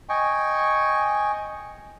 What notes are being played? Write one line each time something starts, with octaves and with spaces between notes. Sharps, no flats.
D#5 G5 G#5 C#6